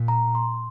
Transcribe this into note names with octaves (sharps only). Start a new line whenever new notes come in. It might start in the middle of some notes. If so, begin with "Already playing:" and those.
Already playing: A#2
A#5
C6